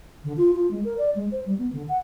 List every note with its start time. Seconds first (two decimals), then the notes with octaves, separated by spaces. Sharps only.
0.24 D3
0.37 F4
0.55 F4
0.71 G#3
0.84 A#4
0.98 D5
1.15 G#3
1.31 C5
1.46 G3
1.58 B3
1.73 D3
1.89 F#5